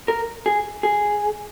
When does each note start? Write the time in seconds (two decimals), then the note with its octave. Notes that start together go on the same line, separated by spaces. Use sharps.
0.08 A#4
0.46 G#4
0.83 G#4